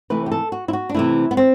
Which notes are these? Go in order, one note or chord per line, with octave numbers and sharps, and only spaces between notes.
C3 E3 A3 B4
G4
A4
F#4
E4
F#4
D4
C3 E3 A3 E4
B3
C4